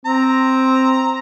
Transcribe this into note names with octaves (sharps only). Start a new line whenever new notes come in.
C4 A#5